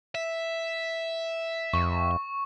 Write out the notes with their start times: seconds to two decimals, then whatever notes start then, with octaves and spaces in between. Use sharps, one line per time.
0.15 E5
1.73 F2 C#6